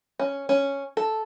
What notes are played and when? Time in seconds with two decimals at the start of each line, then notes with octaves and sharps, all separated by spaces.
0.20 C#4
0.49 C#4
0.97 A4